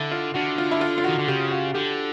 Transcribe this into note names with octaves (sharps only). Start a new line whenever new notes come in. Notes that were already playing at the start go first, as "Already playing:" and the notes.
Already playing: D3 E4
F4
D3 F#4
F4
E4
F4
F4
D#3 F#4
D3
C#3 G4
F#4
D3 G4